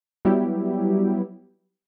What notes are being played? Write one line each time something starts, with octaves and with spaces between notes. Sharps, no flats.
F#3 G3 B3 E4 G4